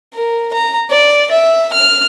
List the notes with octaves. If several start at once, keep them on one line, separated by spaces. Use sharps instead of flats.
A#4
A#5
D5
E5
F6